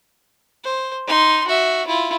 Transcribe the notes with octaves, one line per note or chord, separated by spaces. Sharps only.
C5
D#4 C6
F#4 E5
E4 F4